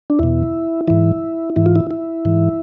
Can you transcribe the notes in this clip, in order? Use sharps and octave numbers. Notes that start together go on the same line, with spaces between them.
D4
E2 B2 E4
G#2 E3 E4
G#2 E3 E4
F4
E4
E4
G#2 E3